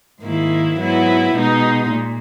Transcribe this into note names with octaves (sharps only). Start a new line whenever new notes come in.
G#2 D#3 A#3 E4
G#2 F#3 B3 E4
B2 G#3 D#4
A#2